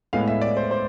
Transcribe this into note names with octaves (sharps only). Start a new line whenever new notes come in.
A2 G#3 B3 F5
E5
D5
C5
C5